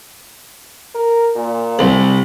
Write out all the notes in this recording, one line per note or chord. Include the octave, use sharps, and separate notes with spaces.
A#4
A#2
C2